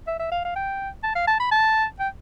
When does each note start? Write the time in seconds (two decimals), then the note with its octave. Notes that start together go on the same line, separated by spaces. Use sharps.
0.07 E5
0.19 E5
0.32 F5
0.45 F5
0.56 G5
1.04 A5
1.15 F5
1.27 A5
1.40 B5
1.52 A5
2.00 G5